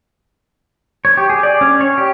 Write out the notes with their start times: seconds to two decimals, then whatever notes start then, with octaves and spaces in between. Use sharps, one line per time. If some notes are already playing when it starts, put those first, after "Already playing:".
1.05 C#5
1.17 G4
1.30 G#4
1.43 D5
1.61 C#4
1.81 C#5
1.98 G4